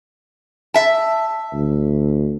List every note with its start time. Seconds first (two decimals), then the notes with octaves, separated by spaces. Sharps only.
0.74 E5 A5
1.53 D2